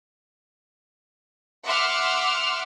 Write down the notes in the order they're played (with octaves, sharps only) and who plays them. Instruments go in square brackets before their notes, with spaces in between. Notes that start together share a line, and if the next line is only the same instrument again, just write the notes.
[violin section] E5 F#5 C6 D6 E6 F6